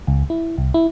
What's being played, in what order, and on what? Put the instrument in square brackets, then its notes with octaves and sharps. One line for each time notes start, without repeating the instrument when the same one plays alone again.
[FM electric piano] C#2
E4
C2
E4